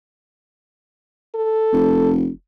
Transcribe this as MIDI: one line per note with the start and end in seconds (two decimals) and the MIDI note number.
1.35 2.13 69
1.73 2.29 29